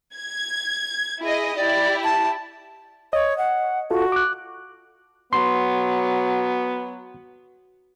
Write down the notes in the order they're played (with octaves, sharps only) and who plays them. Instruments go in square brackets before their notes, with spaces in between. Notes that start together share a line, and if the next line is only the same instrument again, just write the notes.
[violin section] G#6
E4 G#4 D#5
[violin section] E4 G4 [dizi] D5
[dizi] A5
[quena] C#5 [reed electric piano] D#5
[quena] F#5
[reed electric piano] F4 A4 [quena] F#4
[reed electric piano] D6 F#6
[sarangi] F#3 [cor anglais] B3 [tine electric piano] C6